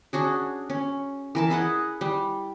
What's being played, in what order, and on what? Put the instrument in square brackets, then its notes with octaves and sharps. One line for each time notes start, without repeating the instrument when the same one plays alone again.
[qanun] C#4 D4 F#4 G#4
C#4
E3 A#4 A5
E4 G#4 D#5 F#5
G3